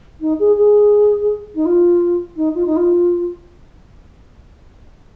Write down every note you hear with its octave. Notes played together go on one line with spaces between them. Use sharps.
D#4
G#4
G#4
D#4
F4
D#4
F4
D#4
F4